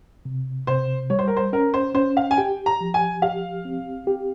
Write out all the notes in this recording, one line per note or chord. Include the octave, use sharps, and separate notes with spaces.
C3
C3 C5
G3 C#5
C5
A#4
C5
C#4 A#4
C5
C#4 C5
F5
G#5
G4 G5
A#5
F3
G#5
G4 F5
C4
G4